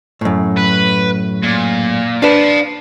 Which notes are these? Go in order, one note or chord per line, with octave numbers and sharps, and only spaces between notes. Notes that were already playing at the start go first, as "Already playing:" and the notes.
F#2 A2
B4
A#2
D4 B4 F5 A5